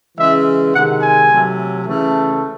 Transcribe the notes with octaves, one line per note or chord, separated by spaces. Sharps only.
C#3 E3 G#3 E5
C3 D#3 G#3 F#5
G#5
C3 F#3 A3
C#3 E3 A3